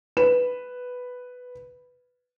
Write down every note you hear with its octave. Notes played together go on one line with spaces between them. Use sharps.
B4 E7